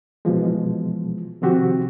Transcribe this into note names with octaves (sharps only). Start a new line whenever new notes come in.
B2 E3 F3 G#3
C3 D#3 F3 C4 F#4 G4